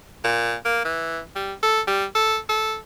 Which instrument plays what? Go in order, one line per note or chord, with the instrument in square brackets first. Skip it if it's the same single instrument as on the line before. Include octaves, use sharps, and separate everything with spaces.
[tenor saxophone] A#2
A#3
E3
G3
A4
G3
A4
A4